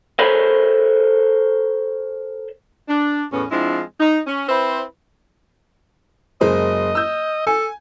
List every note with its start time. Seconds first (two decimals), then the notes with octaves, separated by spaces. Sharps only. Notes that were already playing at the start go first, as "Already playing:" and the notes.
0.19 A4 A#4 C5 C#5 G#5 B5
2.89 D4
3.33 E2 A2 B3 C#4
3.51 F3 G#3 C4 D4 E4
4.00 D#4
4.27 C#4
4.48 C4 E4 B4 C5
6.41 F#1 G#3 C5 D#5
6.95 E6 G6
7.47 A4 G#5